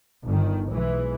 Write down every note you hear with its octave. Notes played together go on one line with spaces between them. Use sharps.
G1 D#3
B1 E3 G#3